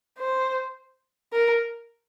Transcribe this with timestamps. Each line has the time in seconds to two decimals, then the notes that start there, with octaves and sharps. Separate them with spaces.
0.18 C5
1.33 A#4